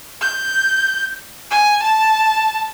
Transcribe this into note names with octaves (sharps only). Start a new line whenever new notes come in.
G6
G#5
A5